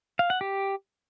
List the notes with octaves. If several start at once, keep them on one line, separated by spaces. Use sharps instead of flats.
F5
F#5
G4